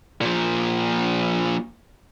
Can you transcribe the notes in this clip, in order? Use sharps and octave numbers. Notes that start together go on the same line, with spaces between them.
A#2 F3